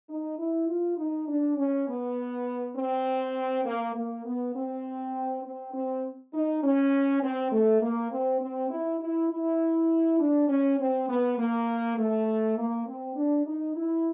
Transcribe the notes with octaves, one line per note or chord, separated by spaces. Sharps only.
D#4
E4
F4
D#4
D4
C#4
B3
C4
A#3
A#3
B3
C4
C4
C4
D#4
C#4
C4
A3
A#3
C4
C4
E4
E4
E4
D4
C#4
C4
B3
A#3
A3
A#3
C4
D4
D#4
E4